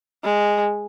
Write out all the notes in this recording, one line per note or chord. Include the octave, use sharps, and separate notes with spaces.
G#3